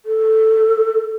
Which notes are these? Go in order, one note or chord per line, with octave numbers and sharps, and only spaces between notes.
A4